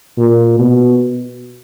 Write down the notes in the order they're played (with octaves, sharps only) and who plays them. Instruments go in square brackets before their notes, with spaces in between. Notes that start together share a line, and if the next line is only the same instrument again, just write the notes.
[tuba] A#2
B2